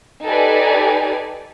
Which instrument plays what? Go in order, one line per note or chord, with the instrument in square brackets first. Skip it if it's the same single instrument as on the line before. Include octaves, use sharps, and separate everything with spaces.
[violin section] D#4 G4 A4 B4 D5 G#5